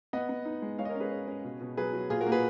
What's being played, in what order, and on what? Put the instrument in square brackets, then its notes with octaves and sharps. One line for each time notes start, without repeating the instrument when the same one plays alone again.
[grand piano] B3 D#5 F#5
B3
D#4
G#3
G#3 C#5 F5
D#5
A#4 C#5
C#4
G#4 B4
C#4
C#4
B2
B2
F#3 G#4 B4
F#3
A#2 F4 G#4
F#4 A#4
A#3
G#4 B4